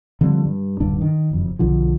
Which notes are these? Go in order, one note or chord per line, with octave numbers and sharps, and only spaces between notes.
D3 F3 G3 C4
G2
D1 G2 D3 D4
D#3
F#1 F2
B1 D3 F3